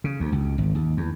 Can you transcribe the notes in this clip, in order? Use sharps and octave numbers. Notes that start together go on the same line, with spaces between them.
C#3
D2
C#2
G#1
D#2
E2